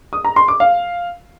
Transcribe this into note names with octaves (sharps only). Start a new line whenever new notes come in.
D#6
A#5
C6
D6
F5